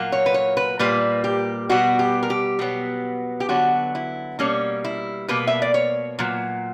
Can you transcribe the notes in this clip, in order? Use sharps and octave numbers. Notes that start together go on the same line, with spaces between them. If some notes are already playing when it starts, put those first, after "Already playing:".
Already playing: A#2 F#3 A#3
C#5
B4
C#5
B4
A#2 G3 A#3 B4
G4
B2 G3 B3 F#4
G4
A#4
G4
B2 F#3 B3
G4
D3 F#3 B3 F#4
E4
B2 G3 A#3 C#4
E4
B2 A#3 B4
E5
D5
C#5
A#2 F#3